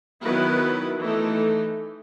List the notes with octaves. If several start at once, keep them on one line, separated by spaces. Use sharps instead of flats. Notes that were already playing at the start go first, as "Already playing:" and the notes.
D#3 F#3 B3 E4 B4
E3 A3 D#4